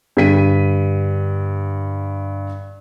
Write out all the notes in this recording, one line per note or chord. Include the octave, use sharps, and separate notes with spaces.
G2 D3 B6 D#7